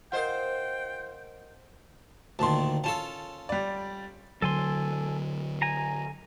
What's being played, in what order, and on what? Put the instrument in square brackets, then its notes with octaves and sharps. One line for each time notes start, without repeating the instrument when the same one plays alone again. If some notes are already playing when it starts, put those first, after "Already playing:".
[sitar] F4 C5 [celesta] A#4 D#5 F#5 [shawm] G5
[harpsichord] D2 A#2 D#3 [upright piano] A5 C6
[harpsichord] C#4 F4 A4 [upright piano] A5 E7
[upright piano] G3 D5
[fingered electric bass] D3 F#3 [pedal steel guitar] A4 G#5 C6
[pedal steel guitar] G#5 A#5